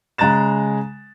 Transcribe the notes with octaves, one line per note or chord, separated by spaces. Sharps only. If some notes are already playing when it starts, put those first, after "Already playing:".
C#3 G#3 A#5 F#6 A6 E7